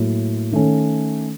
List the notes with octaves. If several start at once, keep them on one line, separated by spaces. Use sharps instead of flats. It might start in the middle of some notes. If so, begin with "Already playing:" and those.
Already playing: A2 F#3 A#3
D#3 A3 C#4